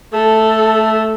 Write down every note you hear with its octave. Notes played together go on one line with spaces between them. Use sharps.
A3 A4